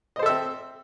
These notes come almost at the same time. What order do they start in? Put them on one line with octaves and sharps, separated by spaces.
D#5 C5 A4 E5 C4